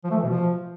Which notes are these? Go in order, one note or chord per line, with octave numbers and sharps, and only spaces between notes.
F3
A3
E3
B2
F3